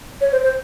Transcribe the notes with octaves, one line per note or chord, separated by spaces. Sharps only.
C#5
C5
C5